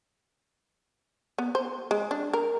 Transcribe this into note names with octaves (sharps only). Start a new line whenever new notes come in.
B3
C5
G#3
D4
A#4